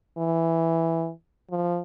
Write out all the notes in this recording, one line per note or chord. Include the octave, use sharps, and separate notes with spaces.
E3
F3